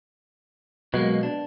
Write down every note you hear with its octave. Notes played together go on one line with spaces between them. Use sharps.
B2 F#3 G#3 A#3
D4